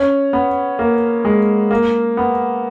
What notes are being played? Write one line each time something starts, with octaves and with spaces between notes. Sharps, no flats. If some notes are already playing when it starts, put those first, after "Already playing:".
Already playing: C#4
B3
A#3
G#3
A#3
B3